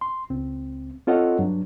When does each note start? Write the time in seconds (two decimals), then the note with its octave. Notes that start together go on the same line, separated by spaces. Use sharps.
0.01 C6
0.30 C#2 C4
1.07 C4 F4 A4 C#5 D#5 F#5
1.39 G2 F#3 D4